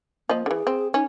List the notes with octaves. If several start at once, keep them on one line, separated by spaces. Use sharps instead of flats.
F3 A#3 D#5
D3 E3 G#4
C4
C#4 D#4